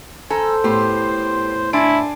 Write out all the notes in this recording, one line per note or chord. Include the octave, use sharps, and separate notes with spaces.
A4 C5 G#5 A#5
A2 B3 G4 C6
D4 E4 G#5 C6 D7